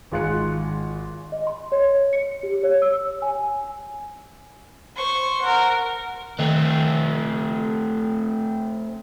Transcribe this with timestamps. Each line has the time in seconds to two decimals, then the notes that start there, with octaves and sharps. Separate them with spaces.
0.12 G#1 G#3 F4 F#6 C#7
1.32 D#5
1.47 C6
1.72 C#5
2.13 C#7
2.43 G4
2.63 C#5
2.82 E6
3.22 G#5
4.96 C5 C#6
5.42 A#4 F#5
6.39 D#3 A3 C4